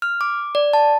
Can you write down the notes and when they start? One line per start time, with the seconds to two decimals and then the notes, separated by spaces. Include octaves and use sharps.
0.02 F6
0.21 D6
0.55 D5
0.73 A5